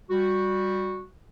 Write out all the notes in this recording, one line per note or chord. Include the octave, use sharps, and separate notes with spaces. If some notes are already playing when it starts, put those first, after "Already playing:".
G3 F#4